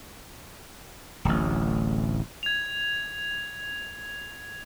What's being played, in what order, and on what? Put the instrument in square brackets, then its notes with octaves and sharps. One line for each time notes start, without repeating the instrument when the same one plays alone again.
[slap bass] D1 A1
[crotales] G#6 F7